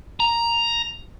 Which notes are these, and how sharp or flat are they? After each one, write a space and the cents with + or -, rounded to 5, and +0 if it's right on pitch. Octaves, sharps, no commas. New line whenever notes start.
A#5 +5